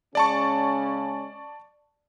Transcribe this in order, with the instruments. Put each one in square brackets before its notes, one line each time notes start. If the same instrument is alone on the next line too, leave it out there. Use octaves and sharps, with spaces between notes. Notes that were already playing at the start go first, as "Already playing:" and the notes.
[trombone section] C#3 G#3 C#4 [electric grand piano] D5 A5 C#6